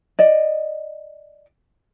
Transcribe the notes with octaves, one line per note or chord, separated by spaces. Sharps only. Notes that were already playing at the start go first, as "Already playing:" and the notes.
D5 D#5